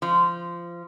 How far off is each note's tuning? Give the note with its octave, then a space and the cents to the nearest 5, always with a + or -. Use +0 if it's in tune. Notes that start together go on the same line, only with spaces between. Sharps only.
F3 -20